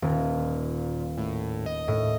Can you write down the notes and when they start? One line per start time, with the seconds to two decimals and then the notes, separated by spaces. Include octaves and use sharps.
0.02 D#1 A#2
1.18 A2
1.66 D#5
1.88 A2